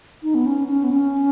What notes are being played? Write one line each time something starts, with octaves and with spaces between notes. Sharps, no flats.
D#4
B3
C#4
C#4
B3
C#4